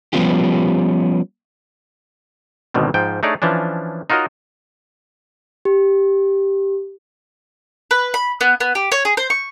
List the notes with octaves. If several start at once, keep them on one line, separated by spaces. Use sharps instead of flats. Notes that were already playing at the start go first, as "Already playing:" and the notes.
F3 G3 B3 C#4 F4 G4
G#1 G#2 B2 D3 D#3
G#2 F3 G5
A3 D4 D#4 G#4 C#5 D5
E3 F3 C#4 D4
D#4 F4 F#4 A#4 C#5 D#5
G4
B4
B5
B3
B3
G4
C#5
G#4
C5
C#6